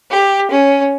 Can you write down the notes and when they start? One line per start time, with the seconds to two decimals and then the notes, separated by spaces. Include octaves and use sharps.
0.11 G4
0.51 C#4